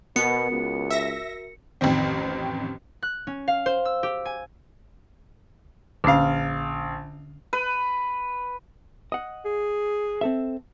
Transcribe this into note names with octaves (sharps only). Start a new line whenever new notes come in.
B2 B3 F#4 A#4 C#7
C#2
E5 A#6
A1 F2 D#3 C4
F#6
C#4
F5
C5
E6
G4
G#5
A#1 D3 C#4 F5
B4
D#5 F#5
G#4
C4 A4 E5